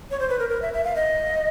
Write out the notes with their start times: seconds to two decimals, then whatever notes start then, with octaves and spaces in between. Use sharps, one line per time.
0.11 C#5
0.20 C5
0.30 B4
0.39 A#4
0.50 A#4
0.62 E5
0.74 E5
0.84 F5
0.96 D#5